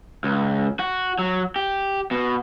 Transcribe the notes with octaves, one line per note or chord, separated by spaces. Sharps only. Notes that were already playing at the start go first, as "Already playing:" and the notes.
C#2
F#4
F#3
G4
B2